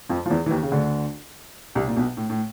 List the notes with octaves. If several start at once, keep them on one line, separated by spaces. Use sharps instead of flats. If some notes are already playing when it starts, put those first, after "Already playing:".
F2 F3
F3
E2 E3
E3
D#2 D#3
C#3
D2 D3
C2 C3
A#2
B1 B2
A2
A2